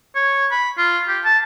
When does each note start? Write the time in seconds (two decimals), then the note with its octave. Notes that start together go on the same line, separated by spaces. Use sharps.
0.15 C#5
0.51 B5
0.78 F4
1.08 G4
1.24 A5